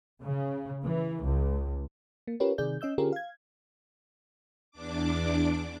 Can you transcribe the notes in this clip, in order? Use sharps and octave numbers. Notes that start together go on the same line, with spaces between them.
C#3
E3
C#2
A#3
C#4 F4 G4 A#4 B4 C#5
C3 D#3 G#4 D5 G6
C#4 D#5 E6 G6
D3 C#4 F4 G4 G#4 A#4
F5 G#6
E2 D4 D6